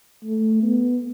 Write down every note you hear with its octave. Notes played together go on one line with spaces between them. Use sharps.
A3
B3